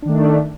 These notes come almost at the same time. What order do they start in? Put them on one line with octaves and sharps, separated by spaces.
D4 D#3 A3